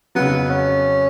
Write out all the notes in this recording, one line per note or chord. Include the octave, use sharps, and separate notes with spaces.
F2 C#3 F#3 B3
C#4